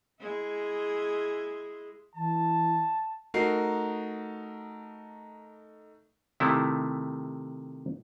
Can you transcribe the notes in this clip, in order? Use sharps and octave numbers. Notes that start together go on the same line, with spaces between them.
G#3 E4 G#4
E3 A5
A3 D#4 F#4 A#4 C7
C3 D#3 A3 E4